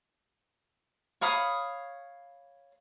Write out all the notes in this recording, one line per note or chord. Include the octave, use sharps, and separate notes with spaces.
C#5 F5 B5 D#6